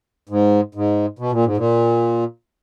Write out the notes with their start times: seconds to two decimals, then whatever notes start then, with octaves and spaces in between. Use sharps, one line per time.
0.29 G#2
0.75 G#2
1.19 B2
1.32 A#2
1.44 G#2
1.57 A#2